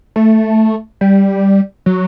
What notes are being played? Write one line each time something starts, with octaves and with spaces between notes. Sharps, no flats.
A3
G3
F#3